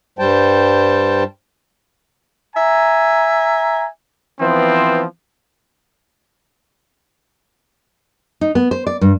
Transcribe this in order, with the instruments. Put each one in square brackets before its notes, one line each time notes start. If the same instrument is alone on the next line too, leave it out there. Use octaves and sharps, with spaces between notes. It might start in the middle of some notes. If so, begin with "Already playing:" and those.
[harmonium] G2 G3 C5 G5 A5
[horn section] E5 G#5 A#5
E3 F3 B3 C4
[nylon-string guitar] D#4
B3
C5
D5
G2